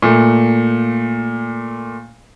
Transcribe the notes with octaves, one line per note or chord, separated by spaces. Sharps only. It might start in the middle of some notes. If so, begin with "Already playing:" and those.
A#2 A3